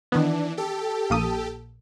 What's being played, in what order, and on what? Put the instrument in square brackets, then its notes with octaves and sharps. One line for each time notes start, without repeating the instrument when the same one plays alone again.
[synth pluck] D#3 B3 [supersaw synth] E3 D4
[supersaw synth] G4 A4
[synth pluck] A#1 A#3 D#6